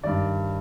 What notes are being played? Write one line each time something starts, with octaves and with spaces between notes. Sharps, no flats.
G2 D#3 D5